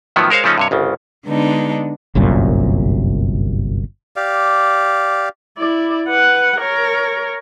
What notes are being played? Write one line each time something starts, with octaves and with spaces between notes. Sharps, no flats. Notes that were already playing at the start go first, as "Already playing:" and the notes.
A2 D#3 F3 F#3 B3
G#3 A#4 C5 C#5 F5
C#3 F3 A3 C#4 D#4
G2 C3 C#5
G1 C2 C#3
D3 G#3 B3 D4 D#4
G1 C2 F#2 A#2
G4 D5 F5
E4 D5
B4 F#5
A#4 C#5